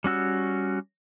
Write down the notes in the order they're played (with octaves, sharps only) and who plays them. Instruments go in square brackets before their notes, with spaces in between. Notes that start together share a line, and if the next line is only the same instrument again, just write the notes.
[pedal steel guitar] G3 C#4 F#4 E6